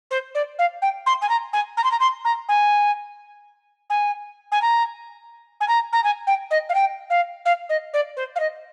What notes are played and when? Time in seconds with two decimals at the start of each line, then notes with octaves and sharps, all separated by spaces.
0.11 C5
0.34 D5
0.58 F5
0.82 G5
1.06 C6
1.21 G#5
1.29 A#5
1.53 G#5
1.77 A#5
1.84 C6
1.91 A#5
2.00 C6
2.24 A#5
2.48 G#5
3.90 G#5
4.51 G#5
4.61 A#5
5.60 G#5
5.68 A#5
5.92 A#5
6.04 G#5
6.27 G5
6.50 D#5
6.69 F5
6.74 G5
7.10 F5
7.45 F5
7.69 D#5
7.93 D5
8.16 C5
8.35 F5
8.39 D#5